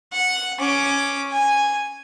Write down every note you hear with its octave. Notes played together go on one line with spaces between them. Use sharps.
F#5
C#4 D6
G#5